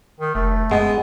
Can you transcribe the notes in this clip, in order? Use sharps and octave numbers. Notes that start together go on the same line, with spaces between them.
D#3
F1 A3
F#2 G#3 B3